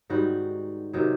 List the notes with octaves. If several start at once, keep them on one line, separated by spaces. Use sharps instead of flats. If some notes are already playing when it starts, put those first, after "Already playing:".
G#2 D#3 G3 F#4
C3 D#3 F#3